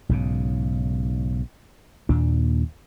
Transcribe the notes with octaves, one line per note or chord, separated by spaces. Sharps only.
B1 G#2 C#3
D#2 A#2 D4